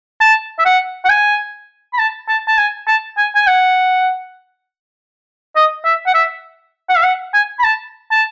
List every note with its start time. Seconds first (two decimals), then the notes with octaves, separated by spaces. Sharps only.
0.21 A5
0.59 E5
0.65 F#5
1.05 F#5
1.09 G#5
1.93 B5
1.98 A5
2.28 A5
2.48 A5
2.58 G#5
2.87 A5
3.17 G#5
3.35 G#5
3.47 F#5
5.56 D#5
5.85 E5
6.06 F#5
6.14 E5
6.89 F#5
6.96 E5
7.04 F#5
7.34 G#5
7.59 B5
7.64 A5
8.11 A5